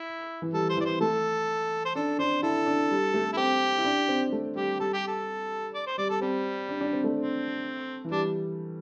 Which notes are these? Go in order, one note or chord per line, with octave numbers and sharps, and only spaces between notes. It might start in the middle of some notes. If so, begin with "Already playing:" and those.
Already playing: E4
E3
G3 A4
C5
E3 D5
C5
A3 A4
C5
D4 A4
D4 C5
E4 A4
D4
G3
A3
E4
C4 G4
E4
D4
C4
A3
G3 G4
G3 A4
G4
A4
D5
C5
G3 D5
A4
G3 C4
D4
D4
C4
A3
C4
E3
G3 D4